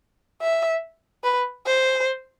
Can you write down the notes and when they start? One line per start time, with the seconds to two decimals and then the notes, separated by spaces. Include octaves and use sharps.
0.42 E5
1.24 B4
1.66 C5